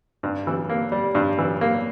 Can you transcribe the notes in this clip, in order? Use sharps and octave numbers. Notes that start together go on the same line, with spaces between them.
G2
E3
A#3
G3
G2
E3
A#3